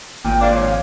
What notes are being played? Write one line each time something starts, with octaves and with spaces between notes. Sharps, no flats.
G#1 A#2 G5
A#3 C4 D4 F5
F3 C#5
F5